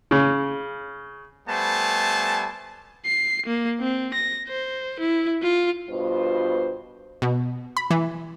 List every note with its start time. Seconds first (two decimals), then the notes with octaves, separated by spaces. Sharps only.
0.11 C#3
1.47 G3 A3 B3 C5 G#5 A5
3.06 C7
3.46 A#3
3.80 C4
4.14 A#6
4.48 C5
5.00 E4
5.42 F4
5.90 G2 B2 F4 C5
7.22 B2
7.77 B5
7.91 E3